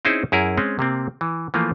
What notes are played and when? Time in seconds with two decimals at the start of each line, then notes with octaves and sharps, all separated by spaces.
0.05 C4 C#4 D#4 E4 G#4 C5
0.32 F#2 E4 G#4 A#4
0.57 G#3 C4 C#4
0.79 C3 A#3 C4
1.21 E3
1.54 E3 F3 A3 A#3 F4